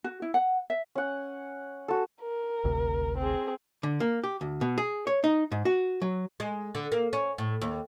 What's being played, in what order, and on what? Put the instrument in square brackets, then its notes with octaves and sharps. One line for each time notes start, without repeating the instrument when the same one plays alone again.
[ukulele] F#4
E4
F#5
E5
[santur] C#4 F#5
F#4 A4
[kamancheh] A#4
[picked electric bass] G#1 D2 C3
[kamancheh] C4 G#4
[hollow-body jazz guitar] D3
A#3
G4
D2
B2
G#4
C#5
D#4
G#2
F#4
F#3
[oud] G#3
D3
A#3
C#4
A2
D#2